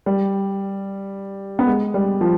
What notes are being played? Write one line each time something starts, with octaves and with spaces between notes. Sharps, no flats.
G3
B3
G#3
G3
F3